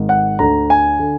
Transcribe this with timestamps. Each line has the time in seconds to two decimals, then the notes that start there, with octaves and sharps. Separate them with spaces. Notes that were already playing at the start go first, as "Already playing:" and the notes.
Already playing: G#1 G#2 D#3
0.09 F#5
0.39 D2 D3 A#5
0.70 G#5
0.99 D3